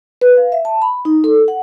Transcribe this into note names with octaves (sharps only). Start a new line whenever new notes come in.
B4
F5
E5
A5
B5
D#4
A4
F#5